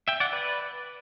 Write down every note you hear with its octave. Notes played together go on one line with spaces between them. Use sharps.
E5 G5
D5 F#5
B4 D5